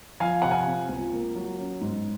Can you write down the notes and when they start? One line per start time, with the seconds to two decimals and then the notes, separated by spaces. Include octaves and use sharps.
0.20 F3 F5 G#5
0.42 C3 F#5
0.51 F5 G#5
0.66 C4
0.89 C#2
1.13 A#3
1.35 F#3
1.58 C#4
1.81 G#2